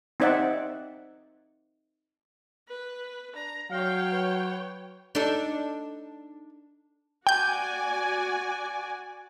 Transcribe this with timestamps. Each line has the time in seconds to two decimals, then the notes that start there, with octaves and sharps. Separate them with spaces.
0.20 C4 D#4 C5 D5 E5 F#5
2.68 B4
3.35 D4 A#5
3.71 F#3 C#5 F5 G5
4.12 B4
5.15 D4 D#4 A4
7.27 F#4 D5 G5 G#5 G6